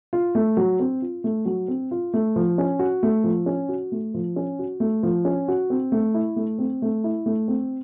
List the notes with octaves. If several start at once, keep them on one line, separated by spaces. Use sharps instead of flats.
F4
A3
F#3
C4
F4
A3
F#3
C4
F4
A3
F3
C#4
F#4
A3
F3
C#4
F#4
A3
F3
C#4
F#4
A3
F3
C#4
F#4
C4
A3
E4
A3
C4
A3
E4
A3
C4